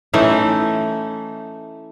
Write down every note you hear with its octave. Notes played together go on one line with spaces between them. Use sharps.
E3 A3 C#4 D#4